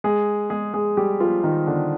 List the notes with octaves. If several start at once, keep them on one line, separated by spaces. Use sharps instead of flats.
G#3 G#4
G#3 G#4
G#3 G#4
G3 G4
F3 F4
D#3 D#4
D3 D4